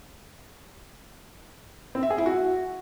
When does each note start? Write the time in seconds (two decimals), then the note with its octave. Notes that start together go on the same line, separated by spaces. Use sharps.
1.95 C4
2.03 E5
2.10 G#4
2.18 E4
2.26 F#4